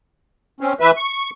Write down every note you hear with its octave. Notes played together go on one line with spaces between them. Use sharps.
C4 C#4
E3 B4 E5
C#6